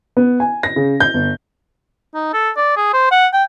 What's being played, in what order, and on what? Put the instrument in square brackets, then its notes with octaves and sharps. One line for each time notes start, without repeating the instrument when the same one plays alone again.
[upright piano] B3
G#5
A#6
C#3
G6
G1
[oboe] D#4
A4
D5
G#4
C5
F#5
G5